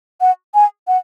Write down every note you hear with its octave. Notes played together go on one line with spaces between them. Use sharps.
F#5
G#5
F#5